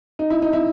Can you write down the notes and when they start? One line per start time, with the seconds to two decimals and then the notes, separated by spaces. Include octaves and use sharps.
0.19 D#4
0.30 E4
0.42 D#4
0.53 E4